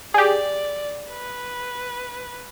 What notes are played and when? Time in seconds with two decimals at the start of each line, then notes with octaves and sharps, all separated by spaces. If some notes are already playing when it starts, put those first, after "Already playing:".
0.14 G4 G#4 D5
1.09 B4